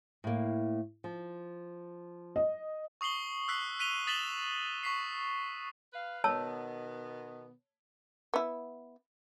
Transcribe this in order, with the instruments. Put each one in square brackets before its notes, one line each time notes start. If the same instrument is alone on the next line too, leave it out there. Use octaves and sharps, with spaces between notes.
[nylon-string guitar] A2 A#3
F3
[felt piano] D#5
[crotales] C#6 D#6 C7 F#7 G7
E6 F#6 B6 C7
F#6 B6 D#7 F7 G7
D#6 A6 B6 E7 F#7 G7
C#6 B6 C7
[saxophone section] B4 F5
[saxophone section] B2 D#3 B3 [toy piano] C#5 A5 E6
[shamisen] B3 E4